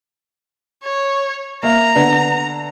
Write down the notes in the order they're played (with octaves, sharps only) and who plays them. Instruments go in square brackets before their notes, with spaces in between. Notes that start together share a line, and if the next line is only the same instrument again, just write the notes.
[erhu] C#5
[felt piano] A#3 E5 [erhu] A#5
[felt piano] D3 B3 D4